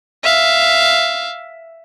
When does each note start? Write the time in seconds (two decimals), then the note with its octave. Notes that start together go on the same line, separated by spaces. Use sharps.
0.24 E5 F5